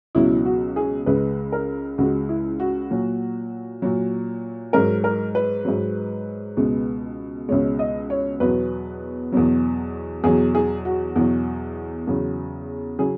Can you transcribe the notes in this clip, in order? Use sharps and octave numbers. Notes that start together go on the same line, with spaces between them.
C#2 B2 F#3 E4
F#4
G#4
C#2 C#3 G#3 B4
A#4
C#2 C#3 G#3 F#4
E4
F#4
A#2 F#3
A#2 F#3
G#2 F#3 A#4
A#4
B4
G#2 F#3
C#2 B2 G#3
C#2 B2 G#3 C#5
D#5
C#5
E2 B2 F#3 B4
E2 B2 F#3
E2 B2 F#3 G#4
G#4
F#4
E2 B2 F#3
E2 C#3 F#3
C#3 F#3 G#4